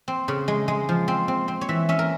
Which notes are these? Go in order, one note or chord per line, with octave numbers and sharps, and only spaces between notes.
C4
C#3
G#3
G#3
F3
C4
C4
C4
C#5
E3 E5
C#4 E5
A#4